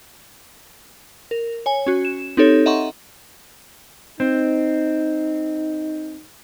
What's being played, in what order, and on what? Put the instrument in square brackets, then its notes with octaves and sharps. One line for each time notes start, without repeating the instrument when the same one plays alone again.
[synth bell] A#4
C#5 G#5
C#4 F#4
E7
C4 D#4 G4 A4 C#5
D#5 E5 F#5 A#5 C6 C#6
[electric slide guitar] C4 [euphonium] D#4